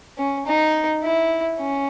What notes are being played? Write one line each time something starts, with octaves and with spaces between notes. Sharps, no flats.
C#4
D#4
E4
C#4